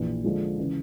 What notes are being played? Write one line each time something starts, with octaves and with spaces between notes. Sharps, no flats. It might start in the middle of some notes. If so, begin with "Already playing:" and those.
Already playing: A#1 E3
D3 F3 G#3
C#3 E3